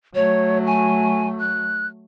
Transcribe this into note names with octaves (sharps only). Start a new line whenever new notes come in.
F#3 A3 C#5
G#5
F#6